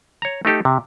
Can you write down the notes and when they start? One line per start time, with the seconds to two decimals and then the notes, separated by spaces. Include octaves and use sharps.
0.22 C#5 A#5
0.45 A3 D#4 G4 A4
0.65 C3